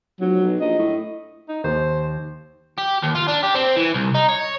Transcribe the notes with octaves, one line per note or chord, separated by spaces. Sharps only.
F1 F#3
B1
A#1 D#5
A2
D#4
D#2 C5
G4
D#2
F4
D4
G4
C4
E3
C2
D#4
C#5